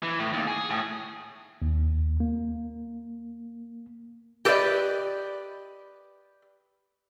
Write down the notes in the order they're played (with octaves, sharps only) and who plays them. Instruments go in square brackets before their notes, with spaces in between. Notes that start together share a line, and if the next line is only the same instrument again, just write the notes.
[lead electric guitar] E3
A2
D#2
G#4
A2
[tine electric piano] D#2
A#3
[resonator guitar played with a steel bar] G4 A4 B4 C5 D5 D#5